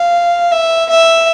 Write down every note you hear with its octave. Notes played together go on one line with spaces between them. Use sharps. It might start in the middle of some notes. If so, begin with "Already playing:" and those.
Already playing: F5
E5
E5